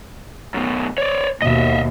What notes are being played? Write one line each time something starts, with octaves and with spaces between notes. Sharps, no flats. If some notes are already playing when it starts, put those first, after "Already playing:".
F#2 B2
C#5 D5
D#2 B2 D#5 E5